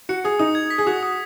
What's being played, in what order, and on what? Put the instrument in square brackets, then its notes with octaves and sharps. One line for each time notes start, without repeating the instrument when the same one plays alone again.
[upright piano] F#4 [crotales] C#7
[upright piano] G#4 [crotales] D#6
[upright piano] D#4 [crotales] D#6
[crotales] G#6
B6
[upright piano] G#4
[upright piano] F#4 [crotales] D#6
[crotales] D#6